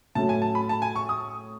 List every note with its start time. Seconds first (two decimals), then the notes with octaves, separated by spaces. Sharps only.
0.15 A2 F#3 A3 C#4 A5
0.29 G#5
0.42 A5
0.55 B5
0.69 A5
0.82 G#5
0.96 C#6
1.09 D#6